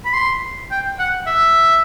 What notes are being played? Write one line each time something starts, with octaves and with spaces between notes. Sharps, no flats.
B5
C6
G5
F#5
E5